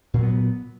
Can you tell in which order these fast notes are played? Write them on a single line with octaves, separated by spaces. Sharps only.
A#2 F#3 B3